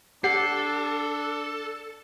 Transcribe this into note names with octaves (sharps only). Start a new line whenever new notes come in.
D4 G4 A4 F#5 C7